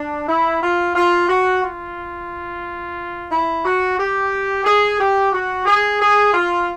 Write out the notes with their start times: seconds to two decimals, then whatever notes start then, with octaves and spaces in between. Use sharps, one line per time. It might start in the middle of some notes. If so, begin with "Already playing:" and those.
Already playing: D4
0.28 E4
0.62 F4
0.95 F4
1.28 F#4
1.63 F4
3.30 E4
3.64 F#4
3.98 G4
4.65 G#4
4.99 G4
5.33 F#4
5.66 G#4
6.00 G#4
6.34 F4